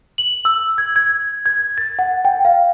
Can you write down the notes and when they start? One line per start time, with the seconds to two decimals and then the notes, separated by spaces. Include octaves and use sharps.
0.18 F#7
0.45 E6
0.78 G#6
0.96 G#6
1.46 G#6
1.78 A6
1.99 F#5
2.25 G5
2.45 F5